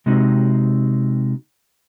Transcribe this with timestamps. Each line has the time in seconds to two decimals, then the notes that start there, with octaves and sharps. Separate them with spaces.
0.06 C3 G#3 C4 D#4 F#4